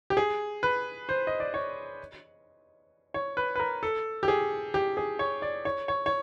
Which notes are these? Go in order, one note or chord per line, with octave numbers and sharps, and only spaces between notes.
G4
G#4
B4
C5
D#5
D5
C#5
C#5
B4
B4
A#4
A4
G4
G#4
G4
G#4
C#5
D5
C#5
C#5
C#5